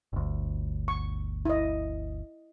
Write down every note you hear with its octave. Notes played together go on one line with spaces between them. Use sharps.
G1 D2
C#6
E4 D#5